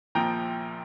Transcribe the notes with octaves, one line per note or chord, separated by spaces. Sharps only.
A#1 A#2 F3 G5 A#5